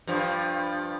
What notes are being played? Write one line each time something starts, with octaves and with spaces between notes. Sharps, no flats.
G2 F3